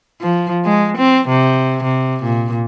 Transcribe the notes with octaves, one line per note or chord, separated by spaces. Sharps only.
F3
G#3
C4
C3
C3
A#2